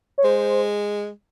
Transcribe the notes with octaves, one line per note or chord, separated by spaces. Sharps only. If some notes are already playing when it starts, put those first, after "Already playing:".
C#5
G#3 C5